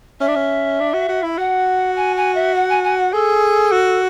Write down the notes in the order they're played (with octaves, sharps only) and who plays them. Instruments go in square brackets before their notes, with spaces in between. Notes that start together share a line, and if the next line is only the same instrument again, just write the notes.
[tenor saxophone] C#4 [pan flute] E5
[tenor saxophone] D4
C#4
D4
F#4
F#4
E4
[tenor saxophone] F#4 [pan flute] F#5
[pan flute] G#5
G#5
E5
F#5
G#5
G#5
F#5
[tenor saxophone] G#4 [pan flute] A4
[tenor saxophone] F#4